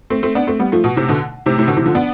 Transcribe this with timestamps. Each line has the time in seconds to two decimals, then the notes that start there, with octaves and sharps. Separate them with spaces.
0.10 A3 C4
0.23 A3 C4
0.35 B3 D4
0.47 A3 C4
0.59 G3 B3
0.72 F3 A3
0.84 B2
0.96 A2 C3
1.09 B2 D3
1.46 A2 C3
1.58 A2 C3
1.67 B2 D3
1.77 C3 E3
1.86 D3 F3
1.95 B3 D4